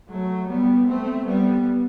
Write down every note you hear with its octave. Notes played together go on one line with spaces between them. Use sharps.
F#3 A3
G3 B3
A3 C4
G3 B3